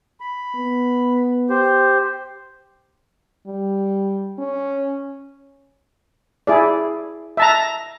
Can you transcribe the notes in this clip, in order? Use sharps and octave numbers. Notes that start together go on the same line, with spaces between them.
B5
B3
G4 C5
G3
C#4
E4 G#4 D5
E5 A5 A#5